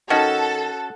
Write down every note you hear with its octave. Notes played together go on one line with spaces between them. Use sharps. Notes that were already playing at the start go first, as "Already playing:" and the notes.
D#3 C#4 F#4 A4 F#5